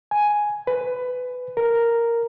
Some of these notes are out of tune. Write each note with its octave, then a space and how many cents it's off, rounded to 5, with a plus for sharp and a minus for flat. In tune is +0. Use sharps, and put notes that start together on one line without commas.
G#5 +5
B4 +15
A#4 +0